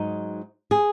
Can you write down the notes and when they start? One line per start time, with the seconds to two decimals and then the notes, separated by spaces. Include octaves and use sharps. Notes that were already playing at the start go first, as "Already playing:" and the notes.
Already playing: G#2 F#3 D#4
0.71 G#4